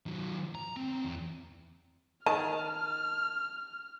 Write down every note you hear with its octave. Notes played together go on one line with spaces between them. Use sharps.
D#3 F#3
A#5
B3 C4
E2
D#3 A5 F6